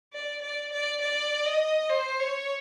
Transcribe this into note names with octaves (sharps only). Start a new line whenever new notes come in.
D5
D5
D5
D5
D#5
C5
C#5